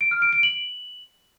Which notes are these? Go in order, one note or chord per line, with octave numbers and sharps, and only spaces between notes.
D7
F6
D7
D7
F#7